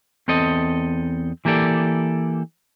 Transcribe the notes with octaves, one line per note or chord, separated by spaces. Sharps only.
E2 C4 A4 D#5
E3 A#3 G4 A4 D5